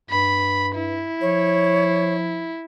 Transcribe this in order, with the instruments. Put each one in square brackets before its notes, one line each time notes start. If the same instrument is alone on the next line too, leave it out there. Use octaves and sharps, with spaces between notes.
[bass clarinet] G2 [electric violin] B5
[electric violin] E4
[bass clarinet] F3 [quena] C#5